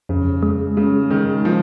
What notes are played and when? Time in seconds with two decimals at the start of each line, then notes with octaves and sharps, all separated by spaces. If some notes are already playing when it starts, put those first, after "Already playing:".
0.09 F2 C#3
0.43 G#3
0.77 C#3 G#3
1.10 D#3 G#3
1.45 F3